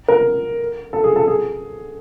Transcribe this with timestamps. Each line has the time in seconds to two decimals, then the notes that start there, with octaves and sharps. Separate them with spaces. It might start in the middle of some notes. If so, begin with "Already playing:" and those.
0.08 A#4
0.93 A4
1.04 G#4
1.16 A4
1.27 G#4